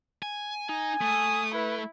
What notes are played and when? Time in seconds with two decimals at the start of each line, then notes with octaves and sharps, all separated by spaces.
0.23 G#5
0.69 D#4 G#5
1.02 A3 D#6
1.54 E4 B4